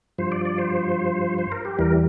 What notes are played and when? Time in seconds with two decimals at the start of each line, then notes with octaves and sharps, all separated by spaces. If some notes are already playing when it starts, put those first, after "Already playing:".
0.18 G2 F3 C5
0.32 D5
0.45 D5
0.58 C5
1.38 C5
1.52 A#4
1.65 G4
1.78 E2 E3 G3 A#4